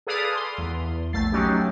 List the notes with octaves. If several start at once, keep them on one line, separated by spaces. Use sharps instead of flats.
G#4 A4 B4 D5 F5 D#6
C6
E2
A#1 A3 A6 C7
F#3 A3 C#4 D#4 F#4 G4